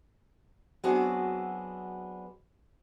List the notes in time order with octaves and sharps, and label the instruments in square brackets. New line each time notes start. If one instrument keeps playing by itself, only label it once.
[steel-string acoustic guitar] F#3 B3 C4 D4 F#4 G#4